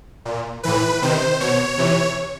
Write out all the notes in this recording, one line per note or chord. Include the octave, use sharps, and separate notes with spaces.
A#2
A2 E3 B4
C3 D#3 C5
B2 C#5
C3 E3